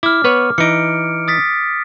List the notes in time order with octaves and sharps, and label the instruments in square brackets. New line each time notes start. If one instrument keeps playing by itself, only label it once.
[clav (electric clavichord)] E4 [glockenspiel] D6 F6
[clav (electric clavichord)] B3 B4 C#5
[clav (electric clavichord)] E3 D#4 [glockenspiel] C#7 D7
[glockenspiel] D#6 A6 B6